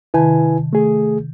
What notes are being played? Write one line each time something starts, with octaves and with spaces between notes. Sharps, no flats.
C3 D#3 E4 B4 G#5 A5
A3 G#4